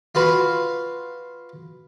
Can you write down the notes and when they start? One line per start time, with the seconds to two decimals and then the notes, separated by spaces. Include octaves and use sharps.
0.15 F4 F#4 B4